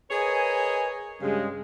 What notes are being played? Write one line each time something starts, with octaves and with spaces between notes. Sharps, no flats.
G#4 A#4 B4 C#5 D#5 G#5
G2 C#3 G#3